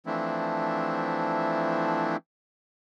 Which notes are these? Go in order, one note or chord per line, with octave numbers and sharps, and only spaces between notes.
E3 F3 A3 C4 D4 E4